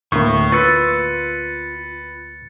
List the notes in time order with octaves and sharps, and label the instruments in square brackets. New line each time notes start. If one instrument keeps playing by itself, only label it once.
[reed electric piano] D2 A#3 [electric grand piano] A2 [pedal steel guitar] C#6
[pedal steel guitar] F4 E6 [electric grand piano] B4 [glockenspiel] A6 C#7